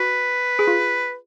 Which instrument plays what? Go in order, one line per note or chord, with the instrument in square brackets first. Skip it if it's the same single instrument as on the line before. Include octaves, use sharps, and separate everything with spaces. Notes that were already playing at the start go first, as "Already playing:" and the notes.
Already playing: [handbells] F#4 [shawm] B4
[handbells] G#4
F4